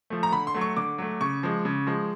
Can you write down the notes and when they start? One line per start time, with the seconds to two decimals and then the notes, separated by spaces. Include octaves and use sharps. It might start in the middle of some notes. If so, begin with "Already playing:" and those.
0.10 F3 A3
0.23 A#5
0.32 D3 B5
0.47 C6
0.54 F#3 A3
0.61 C#6
0.77 D3 D6
0.98 F#3 A3
1.21 C#3 C#6
1.43 F3 G#3
1.65 C#3
1.87 F3 G#3